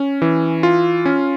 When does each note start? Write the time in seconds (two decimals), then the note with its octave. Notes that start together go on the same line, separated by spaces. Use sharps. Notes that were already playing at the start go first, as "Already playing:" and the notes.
Already playing: C#4
0.22 E3
0.63 F4
1.06 C#4